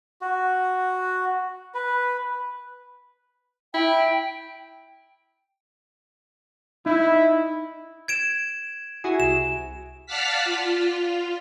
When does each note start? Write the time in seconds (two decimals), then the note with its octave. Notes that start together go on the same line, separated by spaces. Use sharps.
0.22 F#4
1.74 B4
3.74 E4 G5
6.86 D#4 E4
8.08 G#6 D7 E7
9.04 E4 F#4 G#4
9.20 C2 E7
10.06 D5 F5 F#5 A5 F6 B6
10.45 F4